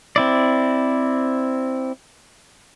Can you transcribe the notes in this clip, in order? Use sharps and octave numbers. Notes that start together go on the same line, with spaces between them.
C4 E4 D5